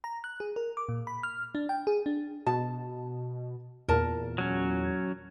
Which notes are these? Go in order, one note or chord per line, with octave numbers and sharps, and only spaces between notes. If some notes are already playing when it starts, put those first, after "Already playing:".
A#5
F#6
G#4
A#4
D6
A#2
B5
F6
D4
G5
G#4
D4
B2 A5
E2 A#2 A#4 A5
F#3 C#4